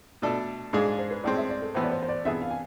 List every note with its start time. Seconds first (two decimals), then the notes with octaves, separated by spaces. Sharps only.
0.22 B2 A3 D4 A4 D5
0.73 G#2 G#3 D4 G#4 F5
0.86 F5
0.99 C5
1.11 B4
1.24 A2 G#3 C4 D5
1.37 E5
1.49 D5
1.62 A4
1.74 A2 E3 B3 C5
1.83 D5
1.92 C5
2.02 C5
2.08 D5
2.25 C3 E3 B3 D4 G#4 E5
2.42 F5
2.51 G#5